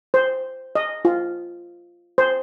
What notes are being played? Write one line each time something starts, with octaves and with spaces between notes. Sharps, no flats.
C5
D#5
F4
C5